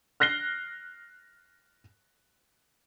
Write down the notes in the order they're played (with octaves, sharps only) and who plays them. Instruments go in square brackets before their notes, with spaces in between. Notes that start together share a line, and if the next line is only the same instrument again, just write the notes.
[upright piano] F6 F#6 A#6 C7 G7